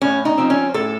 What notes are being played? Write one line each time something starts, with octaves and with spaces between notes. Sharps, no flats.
A2 C#4
D#4
F3 C4
C#4
A2 A4